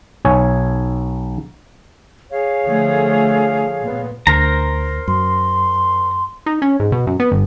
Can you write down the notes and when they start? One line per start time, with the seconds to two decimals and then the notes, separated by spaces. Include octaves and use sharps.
0.25 B1 C#5 G#5
2.31 G#4 C#5 F5
2.62 D3 F3 A3
3.82 A#2 B3
4.27 D2 A#4 C5 A#5
5.08 F#2 C6
6.46 D#4
6.62 C#4
6.80 G#2
6.92 B2
7.07 F#2
7.20 B3
7.32 G1